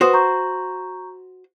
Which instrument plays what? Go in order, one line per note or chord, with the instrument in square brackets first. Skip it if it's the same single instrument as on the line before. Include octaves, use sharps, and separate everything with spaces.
[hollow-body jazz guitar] F#4 C5 [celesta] B4 D#6
[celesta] A#5 C#6 G6